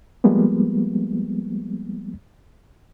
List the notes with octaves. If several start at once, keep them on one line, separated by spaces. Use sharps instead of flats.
F3 G3 G#3 A#3 B3